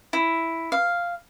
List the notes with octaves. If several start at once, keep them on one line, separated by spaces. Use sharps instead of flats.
E4
F5